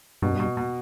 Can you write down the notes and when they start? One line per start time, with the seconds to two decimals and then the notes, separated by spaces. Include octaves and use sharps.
0.22 G2 B2
0.31 F#2
0.35 G2 B2
0.57 B2